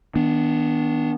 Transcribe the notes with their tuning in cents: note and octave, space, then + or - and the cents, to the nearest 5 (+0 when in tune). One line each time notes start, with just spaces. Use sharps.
D#3 +35 B3 -10 D4 +0